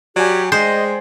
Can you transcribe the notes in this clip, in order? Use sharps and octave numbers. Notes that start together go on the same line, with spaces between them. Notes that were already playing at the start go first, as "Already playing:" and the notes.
F#3 G4 D5 G5 G#5
G#3 C5 D#5